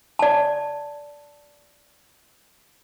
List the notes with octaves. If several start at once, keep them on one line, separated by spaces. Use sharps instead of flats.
D5 A5